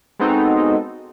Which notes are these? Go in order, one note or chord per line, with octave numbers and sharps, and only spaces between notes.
G#3 B3 C4 D#4 F#4 A4